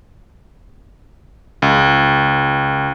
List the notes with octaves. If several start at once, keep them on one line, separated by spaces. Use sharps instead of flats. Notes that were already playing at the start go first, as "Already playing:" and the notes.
C#2